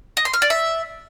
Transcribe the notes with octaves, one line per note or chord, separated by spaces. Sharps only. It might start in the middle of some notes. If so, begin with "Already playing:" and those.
D#5
C6
F6
D5
E5